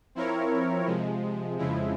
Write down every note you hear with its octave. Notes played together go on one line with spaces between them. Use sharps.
F3 C4 E4 A#4 C#5
C3 F3 G#3
F2 C#3 F3 G#3 E4